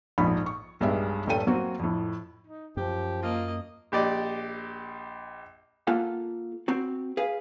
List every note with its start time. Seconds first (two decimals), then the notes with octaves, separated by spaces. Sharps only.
0.18 A#1 F2 G#2 D#4 B5
0.46 C#6
0.80 B1 G2 G#3 G4 E5
1.27 D#1 G2 G3 A3 G5 D#7
1.47 F#3 A#3 C4 F#4
1.79 F2 A2
2.47 D#4
2.77 F#2 F3 G4
3.22 A#3 F4 D#5
3.92 A#1 G4 D5 D#5
5.87 A#3 F4 A4 F#5
6.68 C4 F#4
7.17 G#4 B4 F5